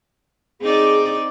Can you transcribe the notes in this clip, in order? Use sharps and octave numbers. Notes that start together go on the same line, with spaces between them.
C4 D#4 G#4 D5